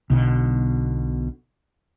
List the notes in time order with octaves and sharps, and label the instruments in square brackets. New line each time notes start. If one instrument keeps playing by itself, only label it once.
[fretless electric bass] B1 B2 D3